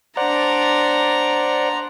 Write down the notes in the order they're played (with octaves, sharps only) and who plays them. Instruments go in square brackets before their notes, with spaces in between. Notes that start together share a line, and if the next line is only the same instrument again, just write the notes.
[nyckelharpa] D4 A#5 [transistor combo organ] C5 D5 F#5